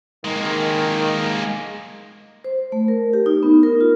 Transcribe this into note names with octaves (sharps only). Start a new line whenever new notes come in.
D#3 G#3 A#3
C5
A3
A#4
G4
D#4
B3
A#4
F4